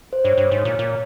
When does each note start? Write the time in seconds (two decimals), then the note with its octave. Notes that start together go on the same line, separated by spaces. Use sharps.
0.13 C5
0.24 G2 C#5
0.38 G2
0.51 G#2
0.65 A#2
0.79 A#2